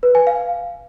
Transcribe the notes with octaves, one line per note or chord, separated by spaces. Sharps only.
B4
G#5
F5